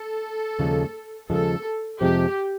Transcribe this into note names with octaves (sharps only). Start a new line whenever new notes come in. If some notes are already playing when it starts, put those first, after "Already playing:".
Already playing: A4
D#2 C#3 F3 G#3
D#2 C#3 F3 G#3 A4
F2 C3 F3 G#3 C4 G4